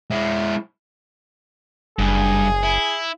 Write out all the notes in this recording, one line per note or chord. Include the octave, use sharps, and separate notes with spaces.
G#3 E4
F#1 G2 G#4
E4